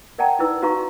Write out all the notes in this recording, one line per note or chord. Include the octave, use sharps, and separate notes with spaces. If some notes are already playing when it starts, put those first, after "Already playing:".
A#4 D5 F#5 G5 A5 A#5
D#4 E4 B4 E6
D#4 F#4 B4 F5 A#5 C#6